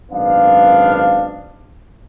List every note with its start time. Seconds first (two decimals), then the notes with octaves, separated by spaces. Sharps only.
0.12 G#1 F#2 B3 D4 F5